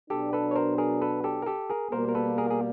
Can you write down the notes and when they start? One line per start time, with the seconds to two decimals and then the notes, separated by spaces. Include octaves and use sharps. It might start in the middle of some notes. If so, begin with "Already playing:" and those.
0.10 B2 F#3 B3 D4 G4 A4
0.33 A4 B4
0.51 C#5
0.55 A#4 C5
0.78 G#4 A#4
1.02 A4 B4
1.24 G4 A4
1.42 A#4
1.46 G4 A4
1.70 G#4 A#4
1.92 B2 G3 A#3 A#4 C5
2.09 A#4
2.15 A4 B4
2.38 G#4 A#4
2.50 G#4